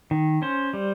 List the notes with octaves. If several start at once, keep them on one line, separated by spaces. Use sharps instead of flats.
D#3
C#4 C5
G3